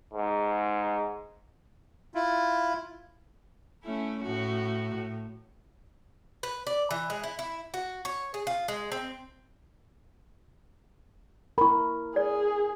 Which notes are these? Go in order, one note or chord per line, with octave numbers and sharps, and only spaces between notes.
G#2
E4 F4
A3 C#4 E4
A2 F#4
A2
B4
D5
E3
G#3
E4
E4
F#4
C#5
G#4
F4
G#3
C4
E4 A#4 B5 C#6
G#4 D5